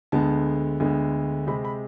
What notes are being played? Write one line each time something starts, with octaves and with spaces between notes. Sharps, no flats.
D2 D3 G#3 B3 A5
D2 D3 G#3 B3
C3 G#3 C4 B5
B5